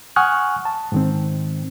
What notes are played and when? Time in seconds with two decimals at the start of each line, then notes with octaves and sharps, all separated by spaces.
0.16 F#5 G#5 C#6 D#6 F6 F#6
0.65 A5
0.92 G#2 D#3 C4